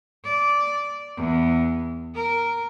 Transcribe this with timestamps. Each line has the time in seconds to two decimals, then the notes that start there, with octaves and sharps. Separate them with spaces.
0.24 D5
1.17 E2
2.15 A#4